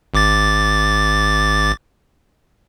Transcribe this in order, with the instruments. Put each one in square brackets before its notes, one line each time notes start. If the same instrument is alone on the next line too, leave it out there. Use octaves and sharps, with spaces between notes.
[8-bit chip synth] G#1 D6 A6